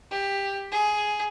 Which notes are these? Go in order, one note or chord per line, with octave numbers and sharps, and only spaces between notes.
G4
G#4